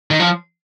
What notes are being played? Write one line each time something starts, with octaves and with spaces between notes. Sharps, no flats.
D#3
F3